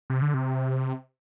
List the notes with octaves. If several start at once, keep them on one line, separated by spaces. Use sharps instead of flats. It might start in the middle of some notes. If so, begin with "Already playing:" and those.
C3
D3
C3